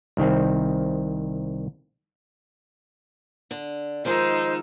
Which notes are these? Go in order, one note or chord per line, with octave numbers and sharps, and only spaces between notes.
C2 D#3 C4
D3
D#3 F3 G#3 D#4 C5 E6